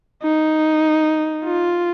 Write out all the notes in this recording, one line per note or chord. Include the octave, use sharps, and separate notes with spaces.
D#4
F4